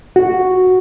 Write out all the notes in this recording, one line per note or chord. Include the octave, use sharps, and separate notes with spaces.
F#4